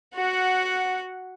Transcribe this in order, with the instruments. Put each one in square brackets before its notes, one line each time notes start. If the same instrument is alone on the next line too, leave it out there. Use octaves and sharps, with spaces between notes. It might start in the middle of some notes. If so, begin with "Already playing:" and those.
[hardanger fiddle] F#4 F#5